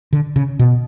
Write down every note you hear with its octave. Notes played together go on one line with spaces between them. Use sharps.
D3
C#3
B2